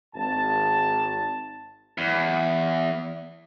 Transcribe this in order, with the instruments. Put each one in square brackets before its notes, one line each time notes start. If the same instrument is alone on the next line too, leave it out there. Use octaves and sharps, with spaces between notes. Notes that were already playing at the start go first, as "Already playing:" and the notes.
[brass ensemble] G#1 A5
[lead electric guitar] E2